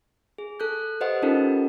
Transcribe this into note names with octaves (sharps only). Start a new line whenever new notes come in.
G#4
A4 F#6 G6
G4 B4 C5 D#5 F#5
C#4 D#4 F4 G4 A4 A#4